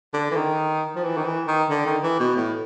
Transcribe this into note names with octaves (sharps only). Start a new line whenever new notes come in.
D3
E3
D#3
F3
E3
D#3
E3
D#3
D3
D#3
E3
B2
A2